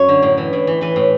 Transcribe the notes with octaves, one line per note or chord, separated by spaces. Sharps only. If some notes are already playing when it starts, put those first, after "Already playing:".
Already playing: F#2 F#3 C#5
D3
A2
E3
A2
E3
E3 B4
A2